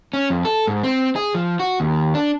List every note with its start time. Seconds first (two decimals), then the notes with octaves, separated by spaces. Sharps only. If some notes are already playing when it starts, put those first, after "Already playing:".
0.13 C#4
0.30 F2
0.45 A4
0.67 G#2
0.83 C4
1.16 G#4
1.35 F3
1.60 F#4
1.80 D#2
2.15 D4